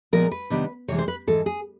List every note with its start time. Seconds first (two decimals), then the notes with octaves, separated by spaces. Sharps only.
0.12 A#2 F3 G#3 B3 A#4
0.31 B4
0.50 C3 D#3 G3 B3 D4
0.88 C3 E3 G#3 C#5
0.98 C5
1.08 B4
1.27 G#2 E3 G#3 A4
1.46 G#4